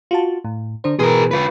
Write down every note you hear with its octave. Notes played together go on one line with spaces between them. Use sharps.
F4 F#4 A5
A2
D3 D4 C5
B2 E3 G#4 A#4 B4
F4 B4